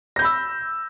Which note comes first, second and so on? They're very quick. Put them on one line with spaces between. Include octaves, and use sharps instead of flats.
A#6 G6 B5 E6